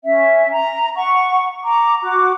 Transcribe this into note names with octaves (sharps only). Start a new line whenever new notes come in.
C#4 E5
A#5
F#5 C#6
A#5 D6
F#4 D6